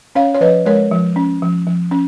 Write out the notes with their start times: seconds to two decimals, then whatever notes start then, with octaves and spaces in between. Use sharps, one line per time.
0.15 C#4 C#5 F5
0.35 C#5
0.41 F3 B4 D#5
0.66 G#3 A#4 C#5
0.91 F3
1.16 C#4
1.42 F3
1.67 F3
1.91 C#4